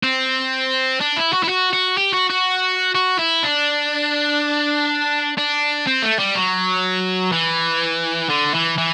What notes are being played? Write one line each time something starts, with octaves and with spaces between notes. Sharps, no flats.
C4
D4
E4
F#4
E4
F#4
F#4
G4
F#4
F#4
F#4
E4
D4
D4
C4
A3
G3
F#3
E3
D3
E3
E3